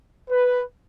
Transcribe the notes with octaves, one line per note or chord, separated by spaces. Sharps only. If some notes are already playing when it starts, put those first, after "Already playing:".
B4